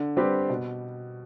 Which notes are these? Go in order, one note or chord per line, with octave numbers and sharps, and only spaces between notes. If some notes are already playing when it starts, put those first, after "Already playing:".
Already playing: D3
G3 C4 G4 B4
B2